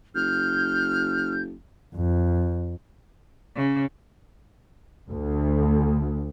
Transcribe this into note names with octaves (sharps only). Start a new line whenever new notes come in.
F#1 F6 G6
F2
C#3
D2